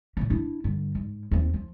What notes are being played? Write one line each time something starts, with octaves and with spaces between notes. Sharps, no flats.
A#2 A#3
D4 E4
G2 D3
G#2
D#2 C4
F3